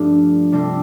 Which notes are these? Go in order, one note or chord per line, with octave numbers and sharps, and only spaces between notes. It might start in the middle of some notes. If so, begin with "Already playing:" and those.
Already playing: G2 F3 A3 D4 F4
C3 G3 D4 A4 C5